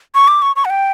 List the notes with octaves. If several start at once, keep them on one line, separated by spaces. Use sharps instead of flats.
C#6
D6
C#6
C#6
F#5
G5